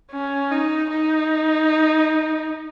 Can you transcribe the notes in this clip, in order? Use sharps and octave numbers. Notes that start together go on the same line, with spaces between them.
C#4
D#4
D#4